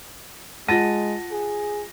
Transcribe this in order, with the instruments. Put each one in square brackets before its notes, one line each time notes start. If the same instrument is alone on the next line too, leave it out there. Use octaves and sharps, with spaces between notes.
[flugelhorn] G#3 [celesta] F4 A6 D#7 [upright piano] F#5 A5 A#6
[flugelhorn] G#4